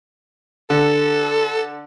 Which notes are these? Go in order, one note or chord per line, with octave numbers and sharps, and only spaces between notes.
D3 A4